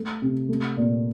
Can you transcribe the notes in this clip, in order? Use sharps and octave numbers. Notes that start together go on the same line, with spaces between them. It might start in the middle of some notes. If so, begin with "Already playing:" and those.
Already playing: A3
C3
A3
A#2